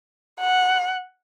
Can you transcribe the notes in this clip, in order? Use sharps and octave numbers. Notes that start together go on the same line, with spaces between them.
F#5